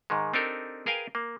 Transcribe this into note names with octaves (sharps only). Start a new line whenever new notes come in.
G#2 D#3 G#3
C4 D4 D#4 G4 A4 A#4
G#4 A#4 B4 F5 G5 G#5
A#3